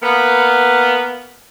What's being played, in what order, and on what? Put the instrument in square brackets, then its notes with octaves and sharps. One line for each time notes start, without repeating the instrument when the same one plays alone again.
[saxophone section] A#3 B3